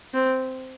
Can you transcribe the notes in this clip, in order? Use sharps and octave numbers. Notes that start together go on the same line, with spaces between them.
C4